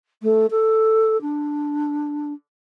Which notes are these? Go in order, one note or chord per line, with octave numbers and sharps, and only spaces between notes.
A3
A4
D4